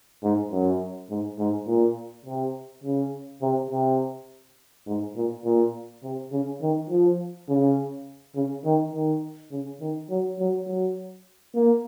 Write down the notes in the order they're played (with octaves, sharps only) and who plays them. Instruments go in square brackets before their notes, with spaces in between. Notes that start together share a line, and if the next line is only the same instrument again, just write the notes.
[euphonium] G#2
F#2
G#2
G#2
A#2
C3
C#3
C3
C3
G#2
A#2
A#2
C3
C#3
D#3
F3
C#3
C#3
D#3
D#3
C#3
D#3
F#3
F#3
F#3
A#3